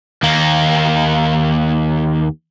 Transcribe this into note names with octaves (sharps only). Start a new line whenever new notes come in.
D#2 A#3